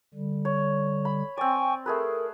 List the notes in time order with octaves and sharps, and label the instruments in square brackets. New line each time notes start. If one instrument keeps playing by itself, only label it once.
[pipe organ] D3 G3
[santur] C#5
B5
[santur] C4 D5 [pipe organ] G5 G#5 C#6
[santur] A3 G#4 B4 [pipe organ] A#4